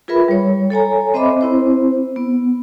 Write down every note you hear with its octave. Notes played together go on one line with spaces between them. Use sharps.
F4 G#4 A#4 B4 E5 B5
G3 C#5
A4 C#5 G#5 A#5
C4 C5 D#5 E5 B5 D6
C4 E4 C5
B3